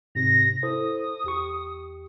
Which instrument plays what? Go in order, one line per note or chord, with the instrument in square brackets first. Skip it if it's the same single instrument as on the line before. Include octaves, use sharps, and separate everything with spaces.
[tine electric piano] G#2 C3 [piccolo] A#6
[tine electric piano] E4 A4 C5 [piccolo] D#6
[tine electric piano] E2 G4 C#6